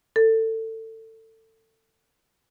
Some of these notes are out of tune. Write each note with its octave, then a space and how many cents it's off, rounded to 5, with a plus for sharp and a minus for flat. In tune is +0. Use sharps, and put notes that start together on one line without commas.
A4 +25